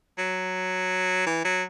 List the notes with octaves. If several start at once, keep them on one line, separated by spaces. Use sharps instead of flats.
F#3
E3
F#3